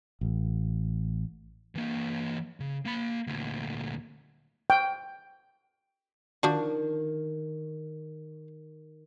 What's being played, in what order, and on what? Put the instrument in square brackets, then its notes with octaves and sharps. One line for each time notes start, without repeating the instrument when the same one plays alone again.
[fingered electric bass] A1
[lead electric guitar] E3 A#3
C#3
A#3 B5
D2 A#2
[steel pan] G5
[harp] D#3 [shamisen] F3 D4 F#4